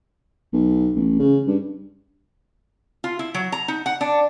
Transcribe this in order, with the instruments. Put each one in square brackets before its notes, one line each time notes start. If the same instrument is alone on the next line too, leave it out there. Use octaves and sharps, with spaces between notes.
[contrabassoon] B1
A1
C#3
G2
[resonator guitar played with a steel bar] F4
E4
F#3
A#5
D#4
F#5
D4